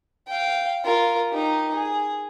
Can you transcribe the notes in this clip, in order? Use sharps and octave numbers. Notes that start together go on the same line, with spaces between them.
F5 G5
F4 A#4
D#4 G4
G#4